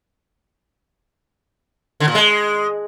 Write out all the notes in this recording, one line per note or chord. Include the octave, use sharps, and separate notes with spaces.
D3
A#2
G#3